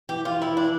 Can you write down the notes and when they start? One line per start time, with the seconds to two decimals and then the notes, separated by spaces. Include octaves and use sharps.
0.09 E3 G4
0.25 F4
0.31 E3
0.42 E4
0.51 E3
0.57 D4